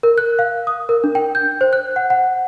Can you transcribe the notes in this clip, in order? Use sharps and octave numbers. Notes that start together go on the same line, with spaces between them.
A#4
F#6
F5
D#6
A#4
D4
G5
G6
C5
F#6
F#5
F#5